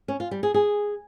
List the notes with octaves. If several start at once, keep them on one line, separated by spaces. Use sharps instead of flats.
C#4
F4
G3
G#4
G#4